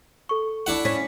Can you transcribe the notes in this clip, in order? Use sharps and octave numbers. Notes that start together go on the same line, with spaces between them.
A4 C#6
D4 E4 F#5
C#4 B6